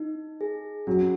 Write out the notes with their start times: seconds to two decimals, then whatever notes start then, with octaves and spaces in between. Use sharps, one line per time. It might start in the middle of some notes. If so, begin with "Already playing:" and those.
Already playing: D#4
0.41 G#4
0.87 F#3 C#4